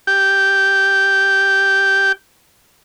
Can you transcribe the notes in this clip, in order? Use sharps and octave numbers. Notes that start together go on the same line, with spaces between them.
G4 G5